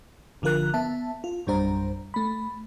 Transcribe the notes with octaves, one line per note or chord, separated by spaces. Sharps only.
G1 D3 F3 F4 A#4 F#6
B3 E5 A5
F4
A#1 F#2 G3 D4 C5 A#5
A3 B5